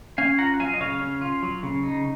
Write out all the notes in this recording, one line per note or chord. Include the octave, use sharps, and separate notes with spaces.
C#4 F5 G#5
F4 F#5 A#5
F#5
F#3 F5 G#5
D#5
C#3 C#5 F5
C#4
F4
F#3
C#3
D#4